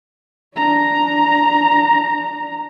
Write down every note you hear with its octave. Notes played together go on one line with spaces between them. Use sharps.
D4 A#5